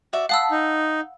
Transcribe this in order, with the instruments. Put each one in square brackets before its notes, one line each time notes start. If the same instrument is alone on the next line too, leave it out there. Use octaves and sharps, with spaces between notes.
[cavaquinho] F#4 D5 E5
[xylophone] F5 D#6 E6 [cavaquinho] F#5 A5 B5
[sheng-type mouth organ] D#4